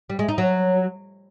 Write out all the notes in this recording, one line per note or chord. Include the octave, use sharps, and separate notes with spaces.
G3
G#3
D#4
F#3